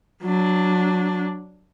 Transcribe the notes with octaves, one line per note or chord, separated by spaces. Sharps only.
F#3 D4